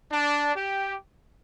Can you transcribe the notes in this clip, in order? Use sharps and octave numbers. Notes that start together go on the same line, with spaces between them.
D4
G4